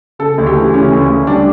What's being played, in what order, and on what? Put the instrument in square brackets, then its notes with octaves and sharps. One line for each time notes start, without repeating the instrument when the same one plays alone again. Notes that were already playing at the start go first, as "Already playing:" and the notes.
[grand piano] C#3 A4
D2
G4
E3
C#3 C#4
D2
D2
G3 D4